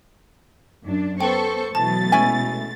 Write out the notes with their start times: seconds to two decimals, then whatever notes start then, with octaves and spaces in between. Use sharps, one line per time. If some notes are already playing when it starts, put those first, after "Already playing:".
0.84 F#2 D4
1.21 B3 A4 B4 C5 G5 C#6
1.75 B2 E3 F#3 A3 A5 A6
2.12 G#3 C#4 E4 G#5